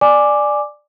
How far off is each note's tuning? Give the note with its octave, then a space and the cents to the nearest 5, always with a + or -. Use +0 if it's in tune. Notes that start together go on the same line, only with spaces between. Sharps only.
D5 +10 G#5 +0 D6 +0